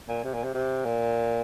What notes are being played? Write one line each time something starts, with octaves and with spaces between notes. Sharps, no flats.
A#2
C3
A#2
C3
C3
A#2